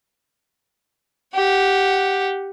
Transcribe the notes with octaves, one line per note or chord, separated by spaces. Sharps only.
G4 F#5